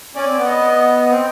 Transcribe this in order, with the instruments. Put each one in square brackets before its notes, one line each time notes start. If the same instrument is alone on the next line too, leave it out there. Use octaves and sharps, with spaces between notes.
[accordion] C#4 [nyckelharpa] D5
[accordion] C4
B3
[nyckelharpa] D#5
[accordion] C4